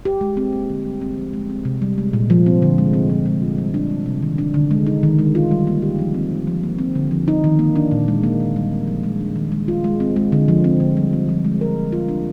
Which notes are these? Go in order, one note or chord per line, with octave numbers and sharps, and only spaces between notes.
G4
G#3
C4
A#3
D3
G3
C4
F3
G#3
C4
C3
G3
G#3
A#2
F3
C4
D3
G#3
C4
F3
G#3
F4
G3
D4
G3
C3
D#3
D4
D3
G#3
D#4
D#3
G#3
F4
G3
A#3
G4
F3
C4
D#4
F3
A#3
C4
D3
F3
D#4
D#3
A#3
D4
A#2
G#3
A#3
D#3
G3
C4
F3
G#3
D4
D#3
G#3
F4
G#3
C4
G#3
D3
F3
C4
D3
G3
C4
F3
G#3
A#4
A#3
F4
D4